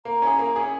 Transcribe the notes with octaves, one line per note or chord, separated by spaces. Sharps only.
A#3 A#5
C#4 E4 G#4
A#3
C#4 E4 G#4